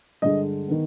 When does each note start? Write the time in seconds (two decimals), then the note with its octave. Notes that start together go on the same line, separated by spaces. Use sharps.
0.22 G2 D3 G#3 D#5
0.68 D#3 B3